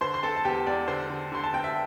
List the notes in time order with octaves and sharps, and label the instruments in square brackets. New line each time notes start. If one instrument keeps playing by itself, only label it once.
[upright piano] D3 C5 C6
C6
C4 A4 A5
A5
E2 G4 G5
E2 D5
D3 C5
D3
D3 C6
A5
C4 G5
E5